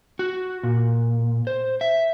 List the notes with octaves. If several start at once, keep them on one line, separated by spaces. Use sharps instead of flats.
F#4
A#2
C5
E5